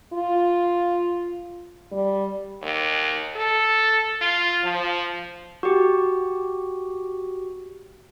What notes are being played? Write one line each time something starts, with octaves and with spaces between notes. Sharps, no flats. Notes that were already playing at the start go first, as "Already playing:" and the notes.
F4
G3
D#2
A4
F4
F3
F#4 G4